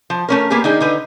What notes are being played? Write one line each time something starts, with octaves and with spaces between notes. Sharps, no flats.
F3
A3 C#4 A#4
A#3 B3 G4 G#4
D#3 D4 D#4 G#4
D3 D#4 B4